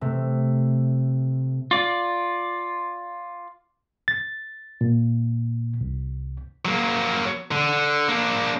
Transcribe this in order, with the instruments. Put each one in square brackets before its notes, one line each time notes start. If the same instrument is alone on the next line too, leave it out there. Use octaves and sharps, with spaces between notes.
[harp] C3 A3
[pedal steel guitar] F4 D5
[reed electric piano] A6
A#2
C2
[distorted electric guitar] F#3 A#3
D3
A#3 D4